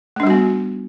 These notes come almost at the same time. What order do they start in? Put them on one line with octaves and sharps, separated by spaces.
A3 D4 G3 F#4 B3